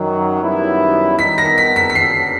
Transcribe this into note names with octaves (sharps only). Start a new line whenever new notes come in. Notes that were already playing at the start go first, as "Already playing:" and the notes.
Already playing: F#2 D#3 F#3
F#2 D#3 G3 B3 E4
D#3 G3 B3 D#4 B6
A#6
B6
B6
B6
F#2 C#3 F#3 A#3 D4 C7